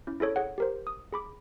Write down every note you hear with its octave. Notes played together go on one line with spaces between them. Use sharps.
C#4 E4
E4 G#4 A4 C#5
G#4 C#5 F#5
G4 A#4 C5
D#6
G#4 B5 D6